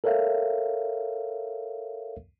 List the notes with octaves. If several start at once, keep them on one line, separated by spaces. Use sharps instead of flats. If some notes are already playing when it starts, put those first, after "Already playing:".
A4 A#4 C#5 E5 F5